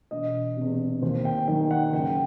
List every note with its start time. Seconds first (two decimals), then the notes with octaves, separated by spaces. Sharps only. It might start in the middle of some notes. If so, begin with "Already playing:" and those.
0.11 E1 D#5
0.57 E2 C3
1.02 D#2 C5
1.25 G5
1.48 D#3 G5
1.71 F#5
1.93 F#1 G5